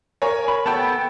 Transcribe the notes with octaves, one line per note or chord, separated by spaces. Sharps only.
A#4 C#5 G#5
B5
B3 A4 G5 A5